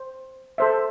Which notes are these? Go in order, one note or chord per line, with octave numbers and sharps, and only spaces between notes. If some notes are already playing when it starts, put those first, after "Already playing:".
Already playing: C5
A4 C5 E5